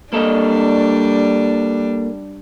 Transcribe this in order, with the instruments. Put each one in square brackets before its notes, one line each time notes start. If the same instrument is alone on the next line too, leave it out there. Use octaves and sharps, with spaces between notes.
[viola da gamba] G3 D4 [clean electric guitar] A#3 A4 D#5